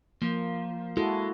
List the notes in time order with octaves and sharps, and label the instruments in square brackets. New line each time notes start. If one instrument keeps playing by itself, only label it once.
[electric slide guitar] F3 [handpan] A#3
[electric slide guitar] G#3 [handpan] E4 F#4 A4